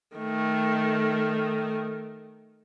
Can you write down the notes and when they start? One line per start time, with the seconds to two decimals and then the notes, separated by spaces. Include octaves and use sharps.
0.16 D#3 A3